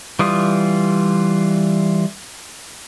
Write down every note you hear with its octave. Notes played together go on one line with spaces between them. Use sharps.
E3 G3 F4 D#6